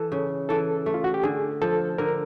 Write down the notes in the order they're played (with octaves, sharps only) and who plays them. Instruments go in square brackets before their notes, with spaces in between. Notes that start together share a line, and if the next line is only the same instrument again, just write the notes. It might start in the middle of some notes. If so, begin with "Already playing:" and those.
Already playing: [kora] E3 [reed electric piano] A4
[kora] C#3
[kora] E3 [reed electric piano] A4
[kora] A3
[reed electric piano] F4
F#4
G4
[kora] D3 [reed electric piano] G#4
[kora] F3 [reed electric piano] A4
[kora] D3 [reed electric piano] A#4